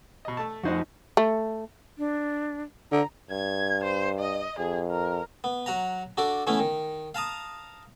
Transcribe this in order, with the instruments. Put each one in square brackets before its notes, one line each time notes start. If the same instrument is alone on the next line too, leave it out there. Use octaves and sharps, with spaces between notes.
[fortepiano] B2 D#5
A3 A5
[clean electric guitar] F2 D#4 D#5 [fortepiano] F#4 C5 F#5
[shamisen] A3
[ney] D4
[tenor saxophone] D3 [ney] A#5
[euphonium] G2 [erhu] G#6
[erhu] C5
D#5
[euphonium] F2 [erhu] G#4
[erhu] A#4
[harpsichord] B3
F#3 F#5 A#5
D4 F#4 A4 D5
E3 A3 B3 C#4 E4
D#3
F5 A5 A#5 D#6